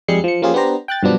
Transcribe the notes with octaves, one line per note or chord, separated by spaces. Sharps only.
F2 G3 G#3 G#4 C7 C#7
F3 C#7
F3 A#3 C#4 F4 G4 G#4
B3 D4 G4 C5 A#5
G5 F#6 A6
G2 B2 F3 F#3 B3 D4